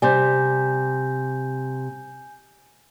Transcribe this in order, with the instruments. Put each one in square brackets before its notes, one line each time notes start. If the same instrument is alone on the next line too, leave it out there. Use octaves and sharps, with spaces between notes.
[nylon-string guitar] C3 G3 [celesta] G#5 G6